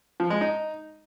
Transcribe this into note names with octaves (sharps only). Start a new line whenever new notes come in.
F3
G#3
D#4